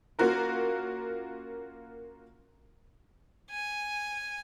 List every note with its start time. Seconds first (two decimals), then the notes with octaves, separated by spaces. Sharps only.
0.19 A#3 C#4 F4 F#4 A#4
3.51 G#5